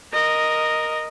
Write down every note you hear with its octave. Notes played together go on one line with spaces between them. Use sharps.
A#4 D#5